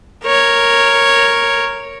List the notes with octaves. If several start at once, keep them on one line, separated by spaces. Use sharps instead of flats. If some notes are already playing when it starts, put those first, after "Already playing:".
A#4 C#5